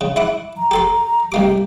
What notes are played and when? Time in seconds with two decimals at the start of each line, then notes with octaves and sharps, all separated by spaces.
0.01 C#3
0.16 E4 F#5 D6
0.57 A#5
0.71 G4 A4 C6
1.32 C2 A#3 G4 D6